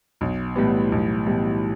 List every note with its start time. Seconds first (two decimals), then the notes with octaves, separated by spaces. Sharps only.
0.21 B1
0.56 A2 E3 G3 B3
0.92 B1
1.27 A2 E3 G3 B3